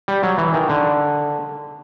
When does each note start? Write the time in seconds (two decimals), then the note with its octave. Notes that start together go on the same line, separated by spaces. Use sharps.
0.08 G3
0.23 F#3
0.38 E3
0.54 D#3
0.69 D3